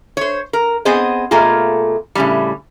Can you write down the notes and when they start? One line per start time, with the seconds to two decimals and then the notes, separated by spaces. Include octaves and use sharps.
0.17 C5 C#5
0.53 A#4
0.85 B3 C4 G#4 C5 D#5
1.31 B2 A3 A#3 F4 G#4
2.15 A2 C#3 G3